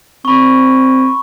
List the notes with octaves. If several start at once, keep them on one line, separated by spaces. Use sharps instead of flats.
C4 B5 C#6